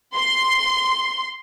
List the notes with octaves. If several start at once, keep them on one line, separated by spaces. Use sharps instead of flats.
C6